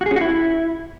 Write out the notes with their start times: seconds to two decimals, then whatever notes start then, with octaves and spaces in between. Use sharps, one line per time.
0.01 F#4
0.06 G#4
0.11 C#4
0.16 F#4
0.21 E4